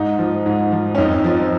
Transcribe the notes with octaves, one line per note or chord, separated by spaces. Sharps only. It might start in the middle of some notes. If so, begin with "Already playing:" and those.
Already playing: G#2 D#4
F3
G#2
F3
C#4
F2 D#4
F3